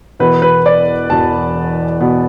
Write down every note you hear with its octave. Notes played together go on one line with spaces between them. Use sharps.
E1 E2 B2 B3 B4
B4
D5
E1 E2 B2 B3 A5
B2 B3